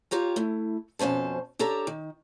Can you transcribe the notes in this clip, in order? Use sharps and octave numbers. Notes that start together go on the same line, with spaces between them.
F4 G4 C#5 A#5
A3 E4
F2 B2 C#4 C5 A5
D4 G4 A4 C#5 A#5
D#3